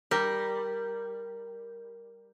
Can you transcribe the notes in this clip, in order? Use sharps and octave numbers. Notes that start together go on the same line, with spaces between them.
G3 A#4